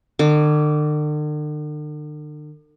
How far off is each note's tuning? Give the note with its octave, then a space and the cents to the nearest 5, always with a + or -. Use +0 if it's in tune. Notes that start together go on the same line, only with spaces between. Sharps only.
D3 +45 D6 -25